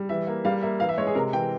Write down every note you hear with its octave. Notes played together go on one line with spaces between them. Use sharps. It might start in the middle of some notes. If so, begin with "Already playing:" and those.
Already playing: G3
E3 E5
A#3
G3 F5
A#3 E5
E3 F5
E5
G#3 C#5
G#4
C3 A#4
E3 G5